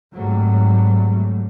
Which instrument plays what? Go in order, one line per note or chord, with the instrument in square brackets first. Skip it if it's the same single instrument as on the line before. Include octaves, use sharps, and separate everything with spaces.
[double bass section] G#1 G#2 F#3 G3 A3